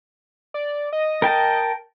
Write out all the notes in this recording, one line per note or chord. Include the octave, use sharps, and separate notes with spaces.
D5
D#5
A#4 G5 A5